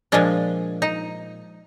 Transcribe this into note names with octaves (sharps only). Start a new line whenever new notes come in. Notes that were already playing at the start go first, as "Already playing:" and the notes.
A#2 F3 G#3 D4
D#4